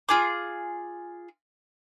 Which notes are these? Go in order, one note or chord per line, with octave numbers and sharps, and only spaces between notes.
F4 G#4 D6